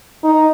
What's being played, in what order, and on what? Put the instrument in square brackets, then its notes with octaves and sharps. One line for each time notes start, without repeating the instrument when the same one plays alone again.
[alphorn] D#4